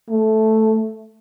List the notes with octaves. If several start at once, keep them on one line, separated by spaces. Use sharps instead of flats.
A3